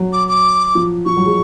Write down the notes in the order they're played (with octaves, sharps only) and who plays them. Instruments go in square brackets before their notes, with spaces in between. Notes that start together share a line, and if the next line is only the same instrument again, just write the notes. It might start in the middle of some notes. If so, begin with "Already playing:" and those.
Already playing: [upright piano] F#3
[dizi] D6
D6
[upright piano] F3
[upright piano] F3 [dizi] C#6
[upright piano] F#3
G#3